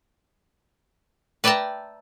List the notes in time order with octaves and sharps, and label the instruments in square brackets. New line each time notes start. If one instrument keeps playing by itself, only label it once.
[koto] B4 D5 E5 G5 A5 A#5